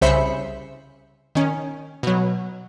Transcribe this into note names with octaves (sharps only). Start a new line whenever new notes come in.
C2 C#3 C5 E5 B5 C#7
D#3 C#4
B2 F#3